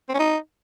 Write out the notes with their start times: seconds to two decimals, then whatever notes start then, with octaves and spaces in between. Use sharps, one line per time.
0.09 C4
0.14 C#4
0.19 D#4